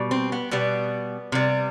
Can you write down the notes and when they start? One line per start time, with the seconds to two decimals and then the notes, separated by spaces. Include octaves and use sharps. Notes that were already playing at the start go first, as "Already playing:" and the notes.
Already playing: B2 G3
0.11 C4
0.32 B3
0.51 B2 G3 B3
1.32 C3 G3